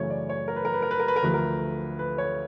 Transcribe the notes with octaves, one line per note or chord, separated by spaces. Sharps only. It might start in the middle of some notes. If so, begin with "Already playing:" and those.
Already playing: F#2 C#3 E3 A3 C#5
D5
C#5
A#4
B4
A#4
B4
A#4
B4
A#4
B4
A#4
D2 D3 F3 A3 B4
A#4
B4
C#5